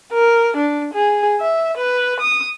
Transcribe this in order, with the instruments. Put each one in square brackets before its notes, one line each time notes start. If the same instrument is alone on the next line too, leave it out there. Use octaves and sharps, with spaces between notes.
[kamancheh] A#4
D4
G#4
E5
B4
D#6